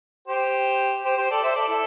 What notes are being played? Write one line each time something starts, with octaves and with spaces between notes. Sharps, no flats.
G4 C5
G4 C5
G4 C5
A4 D5
C5 E5
A4 D5
E4 A4